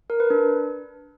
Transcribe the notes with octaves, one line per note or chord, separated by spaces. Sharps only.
A#4
B4
D4